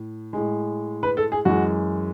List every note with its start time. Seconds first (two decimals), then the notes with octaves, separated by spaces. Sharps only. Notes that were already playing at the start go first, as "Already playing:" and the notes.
Already playing: A2
0.33 A2 G#3
1.03 B4
1.17 A4
1.32 G#4
1.45 F#2 E3 G#3 F#4